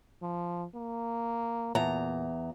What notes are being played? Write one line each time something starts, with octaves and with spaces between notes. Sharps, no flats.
F3
A#3
E2 A#2 A#5